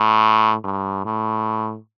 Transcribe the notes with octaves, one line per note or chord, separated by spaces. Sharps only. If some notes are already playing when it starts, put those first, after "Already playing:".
Already playing: A2
G2
A2